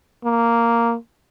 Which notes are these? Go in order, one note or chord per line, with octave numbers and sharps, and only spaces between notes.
A#3